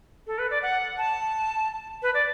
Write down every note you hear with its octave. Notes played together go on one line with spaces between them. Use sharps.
A4
B4
D5
F#5
A5
B4
D5